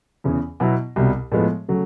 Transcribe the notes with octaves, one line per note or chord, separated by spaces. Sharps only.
E2 C#3 E3
B2 F#3 B3 E4
C2 B2 G3
A2 F3 G#3 B3
C#3 F#3 A3